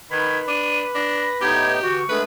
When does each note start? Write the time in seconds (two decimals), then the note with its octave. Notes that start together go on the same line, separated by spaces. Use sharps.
0.11 D#3 B4 B5 G#6
0.48 D4 D#7
0.95 D4 A#6
1.41 A2 B3 D#4 G4 G#6
1.83 D3 E3 F#4 C#6
2.09 G#3 A3 B3 D4 A#4 B4